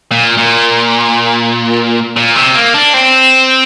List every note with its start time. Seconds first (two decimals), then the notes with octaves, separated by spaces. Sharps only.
0.11 A#2
0.38 A#2
2.16 A#2
2.36 C3
2.54 A#3
2.74 D4
2.94 C4